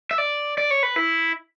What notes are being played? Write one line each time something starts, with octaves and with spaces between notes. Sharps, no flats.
E5
D5
D5
C#5
B4
E4